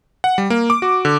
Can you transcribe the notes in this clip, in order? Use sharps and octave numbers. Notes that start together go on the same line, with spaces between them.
F#5
G3
A#3
D6
F#4
D3